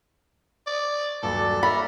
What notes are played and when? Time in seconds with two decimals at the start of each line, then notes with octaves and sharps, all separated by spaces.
0.67 D5
1.23 D#1 G2 F#3 A4 D5
1.63 A#4 C#5 E5 B5